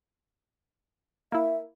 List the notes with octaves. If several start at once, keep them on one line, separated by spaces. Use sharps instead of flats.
A#3 E4 E5